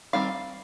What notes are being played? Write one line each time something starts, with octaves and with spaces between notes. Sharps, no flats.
D#3 G3 C4 F5